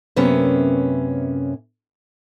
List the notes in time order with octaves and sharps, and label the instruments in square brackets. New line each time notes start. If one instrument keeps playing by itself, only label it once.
[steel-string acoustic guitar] F#2 C3 A#3 B3 C#4